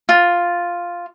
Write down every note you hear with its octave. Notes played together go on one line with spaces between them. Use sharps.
F4